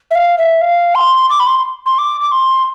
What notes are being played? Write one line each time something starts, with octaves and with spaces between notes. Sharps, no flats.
E5
F5
E5
F5
C6
D6
B5
C6
C6
D6
D6
C6